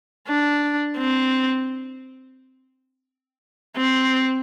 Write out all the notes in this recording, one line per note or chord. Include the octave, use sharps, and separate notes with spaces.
D4
C4
C4